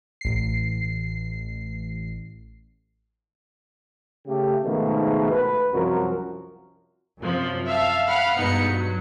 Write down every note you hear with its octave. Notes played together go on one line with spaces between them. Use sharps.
A1 C7
C#3 A3 G4
G#2 B2 D#3 F3 G#3 A3
B4
C2 F#2 F3 F#4 A#4
F#2 C3 F3
E5 F5 A5
F5 F#5 B5
G2 B2 G#3 B3 D#4 C#7
F#3